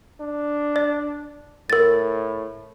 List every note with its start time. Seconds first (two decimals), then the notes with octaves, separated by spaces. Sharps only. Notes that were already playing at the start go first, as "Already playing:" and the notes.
0.21 D4
0.76 D5
1.70 A2 A#4 A6